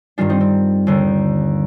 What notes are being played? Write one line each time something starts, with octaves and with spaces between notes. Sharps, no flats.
G2 D#3 G3 D4 F4
C4 D#4
C4
D#2 D3 G3